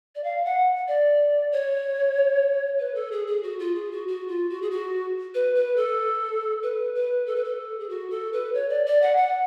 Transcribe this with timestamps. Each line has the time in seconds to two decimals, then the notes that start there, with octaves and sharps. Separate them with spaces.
0.15 D5
0.24 F5
0.45 F#5
0.88 D5
1.52 C#5
2.79 B4
2.95 A4
3.12 G#4
3.27 G#4
3.43 F#4
3.59 F4
3.75 G#4
3.92 F#4
4.08 F#4
4.28 F4
4.50 F#4
4.62 G#4
4.71 F#4
5.35 B4
5.55 B4
5.77 A4
6.63 B4
6.95 B4
7.27 A4
7.36 B4
7.44 A4
7.80 G#4
7.89 F#4
8.11 A4
8.33 B4
8.54 C#5
8.69 D5
8.86 D5
9.02 F#5
9.17 F#5